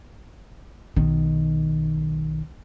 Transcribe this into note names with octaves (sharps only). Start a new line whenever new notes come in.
B1 D#3